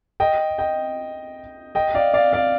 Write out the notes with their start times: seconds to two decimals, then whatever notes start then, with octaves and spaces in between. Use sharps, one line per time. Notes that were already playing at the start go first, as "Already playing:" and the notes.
0.20 D#5 G5
0.58 D#5 G5
1.75 D#5 G5
1.94 D5 F5
2.14 D5 F5
2.33 D5 F5